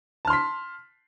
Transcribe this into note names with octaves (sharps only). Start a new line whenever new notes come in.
A5 C6 F6 B6